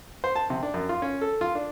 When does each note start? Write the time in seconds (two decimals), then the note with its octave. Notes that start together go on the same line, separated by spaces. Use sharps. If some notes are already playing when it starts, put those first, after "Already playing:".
0.24 C5
0.36 A5
0.50 C3
0.63 D4
0.74 F#2
0.89 F4
1.02 C#4
1.21 A4
1.41 F4
1.55 D4